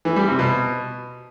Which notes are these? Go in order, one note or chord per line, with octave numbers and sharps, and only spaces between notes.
E3
G3
C3
B2